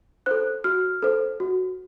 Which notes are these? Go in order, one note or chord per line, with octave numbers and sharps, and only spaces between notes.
A4 C5 F#6
F#4 F6
A4 C5
F#4